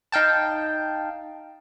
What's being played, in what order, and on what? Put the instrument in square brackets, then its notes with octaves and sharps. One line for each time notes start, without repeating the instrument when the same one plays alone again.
[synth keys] D#4 F5 G5 A5